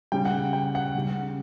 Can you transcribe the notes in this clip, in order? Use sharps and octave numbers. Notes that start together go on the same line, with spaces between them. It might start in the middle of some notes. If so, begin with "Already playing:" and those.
C#3 G3 G5
F#5
G5
F#5
C#3 G3